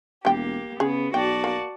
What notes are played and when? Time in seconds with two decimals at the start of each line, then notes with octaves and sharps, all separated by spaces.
0.25 E1 G3 A#3 G4 G5
0.80 C#3 B3 G#4
1.14 B1 F#4 D5 G5 A5
1.44 A#3